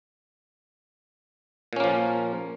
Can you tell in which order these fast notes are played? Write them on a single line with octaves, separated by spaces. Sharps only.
A#2 C#4 A#3 F3